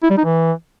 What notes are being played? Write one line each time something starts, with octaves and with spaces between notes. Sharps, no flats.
E4
G3
D#4
E3